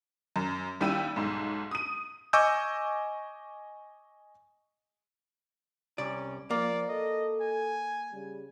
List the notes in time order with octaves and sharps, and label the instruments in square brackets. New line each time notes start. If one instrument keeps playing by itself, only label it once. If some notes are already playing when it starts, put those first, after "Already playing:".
[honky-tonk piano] F#2
D#2 G3 E4 G5 E6 D#7
B1 G#2
D#6 D#7
[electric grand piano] D#5 G#5 C#6 D6 E6 G6
[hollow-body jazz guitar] C2 D5 [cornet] C#4
[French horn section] F3 [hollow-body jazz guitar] A#3 [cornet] D5
[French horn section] A4 [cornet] D#5
[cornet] G#5
[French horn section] C#3 G3